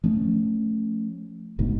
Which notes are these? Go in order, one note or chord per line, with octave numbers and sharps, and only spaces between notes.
F3 A3 C#4
F1 D2 G#2 B2